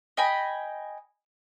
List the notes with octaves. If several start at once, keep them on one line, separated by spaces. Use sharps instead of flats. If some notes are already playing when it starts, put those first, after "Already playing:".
D#5 G5 G#5 B5